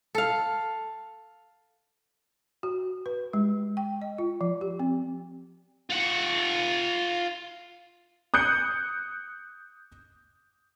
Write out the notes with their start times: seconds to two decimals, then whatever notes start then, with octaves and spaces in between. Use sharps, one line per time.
0.15 A4 F5
2.63 F#4
3.06 B4
3.33 G#3
3.77 G5
4.02 D#5
4.18 F4
4.41 F3
4.61 G4
4.80 C4
5.90 F4 F#5
8.34 D#6 F#6 G6 C#7